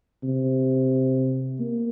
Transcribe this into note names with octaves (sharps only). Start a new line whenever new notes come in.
C3
A#3